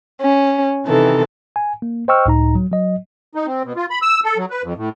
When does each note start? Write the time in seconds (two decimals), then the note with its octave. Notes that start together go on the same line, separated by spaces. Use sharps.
0.22 C#4
0.86 C3 D#3 E3 A4
1.56 G#5
1.82 A#3
2.08 C5 D#5 G5 C#6 E6 F6
2.26 C#2 A2 D#4 A#5
2.55 F#3
2.71 F#3 D#5
3.35 D#4
3.47 C4
3.65 B2
3.76 F4
3.90 B5
4.02 E6
4.24 A4
4.38 F#3
4.50 B4
4.63 F2
4.77 A2